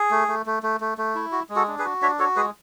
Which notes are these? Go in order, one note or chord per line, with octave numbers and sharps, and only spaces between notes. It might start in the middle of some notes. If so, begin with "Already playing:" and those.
Already playing: G#4
A3
A3
A3
A3
A3
A3
E4
F#4
G#3
F#4 A4
D4
G#4 B4
F#4
D4 C#5 E5
F#4 A4 C#5
G#3 G#4 B4